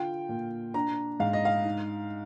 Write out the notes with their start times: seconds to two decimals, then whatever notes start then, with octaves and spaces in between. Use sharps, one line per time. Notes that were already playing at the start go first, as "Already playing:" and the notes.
Already playing: D3 F4 G5
0.29 A#2
0.74 D4 A#5
1.20 G#2 F5
1.33 D#5
1.45 F5
1.65 D#4